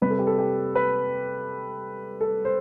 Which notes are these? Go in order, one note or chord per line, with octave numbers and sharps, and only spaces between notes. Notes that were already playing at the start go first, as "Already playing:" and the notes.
C3 G3 C4 B4
A4
G4
A4
G4
B4
A4
C5